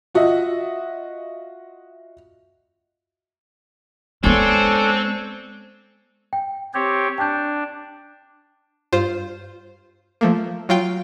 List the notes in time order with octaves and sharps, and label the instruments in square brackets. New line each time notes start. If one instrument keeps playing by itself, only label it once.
[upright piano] F4 F#4 D#5 E5
[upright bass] G#3 B3 [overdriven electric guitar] C4 [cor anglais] D4 [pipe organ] A4 C#5 G#5
[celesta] G5
[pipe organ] C4 G4 C#5 [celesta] G6
[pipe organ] D4 [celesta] G5 A5 G6
[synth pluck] G2 F4 C5
F3 A3 A#3
F#3 F4 F5 G5